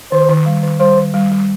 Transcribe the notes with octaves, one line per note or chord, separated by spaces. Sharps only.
D#3 C5
D#3
G3
D#3
G3 C5
D#3
G3
G3